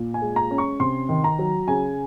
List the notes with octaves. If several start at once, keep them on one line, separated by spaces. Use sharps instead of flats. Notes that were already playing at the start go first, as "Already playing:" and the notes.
Already playing: A#2
G#5
G#3
A#5
C#4
C#6
C3 C6
D#3
A#5
F#3
C#3 G#5